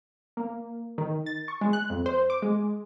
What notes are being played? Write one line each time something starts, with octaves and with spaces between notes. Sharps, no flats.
A#3
D#3
A6
C#6
G#3
F#6
F2
C5
D6
G#3